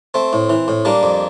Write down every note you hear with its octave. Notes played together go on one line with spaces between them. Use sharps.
A3 C4
A2
E3
A2
G3 A#3 D4
F2